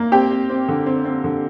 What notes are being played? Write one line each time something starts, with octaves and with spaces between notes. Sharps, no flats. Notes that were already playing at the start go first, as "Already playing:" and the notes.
Already playing: A#3
C4 G4 G5
C4
C4
D3
C4
C4
D3